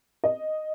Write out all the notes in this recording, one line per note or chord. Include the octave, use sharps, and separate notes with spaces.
D#5